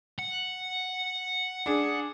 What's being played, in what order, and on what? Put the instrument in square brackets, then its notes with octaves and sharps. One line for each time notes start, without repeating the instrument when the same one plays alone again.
[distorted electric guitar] F#5
[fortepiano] D4 G#4